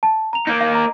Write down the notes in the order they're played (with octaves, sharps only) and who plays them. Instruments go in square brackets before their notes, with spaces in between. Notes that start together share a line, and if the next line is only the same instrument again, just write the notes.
[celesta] A5
A#5 F7
[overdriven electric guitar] A#3 D#4
[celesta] F5
A#5